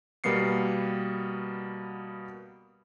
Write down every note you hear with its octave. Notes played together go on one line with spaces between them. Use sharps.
B2 G3 A#3 B3 C7 C#7